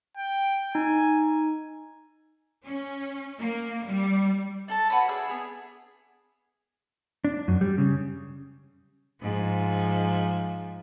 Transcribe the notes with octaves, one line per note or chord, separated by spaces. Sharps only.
G5
D#4 G#5
C#4
A#3
G3
D4 A4 A5
F#4 B4 C#5 B5
D4 G#4 E5 E6
B3 G#4
D4
F#2
G3
C#3
G#2 F3